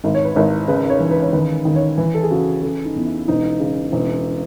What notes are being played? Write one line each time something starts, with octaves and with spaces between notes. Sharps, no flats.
G#1
C#5
B4
G#1 C#5
C#3 B4
C#5
E3
B4
C#5
D#3 B4
D#3
C#5
E3 B4
A4
G#4
C#3 F#4
C#3 A4
D#4
E2
E4
E1 D#4
C#3
E1